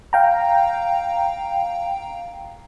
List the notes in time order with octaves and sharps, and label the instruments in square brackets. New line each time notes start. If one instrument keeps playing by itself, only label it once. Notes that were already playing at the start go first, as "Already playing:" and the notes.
[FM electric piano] F5 G5 A#5